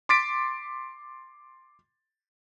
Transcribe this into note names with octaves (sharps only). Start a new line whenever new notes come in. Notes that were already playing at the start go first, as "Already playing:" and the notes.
C6 D6 A6 B6 D7